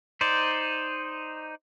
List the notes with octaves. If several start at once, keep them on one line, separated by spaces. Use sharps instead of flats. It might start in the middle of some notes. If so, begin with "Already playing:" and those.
D#4 C5 D5